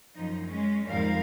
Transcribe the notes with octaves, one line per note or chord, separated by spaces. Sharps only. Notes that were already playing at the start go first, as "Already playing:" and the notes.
F#2 F3 D#4
G#3 C#4
F2 G#2 G3 A#4 F5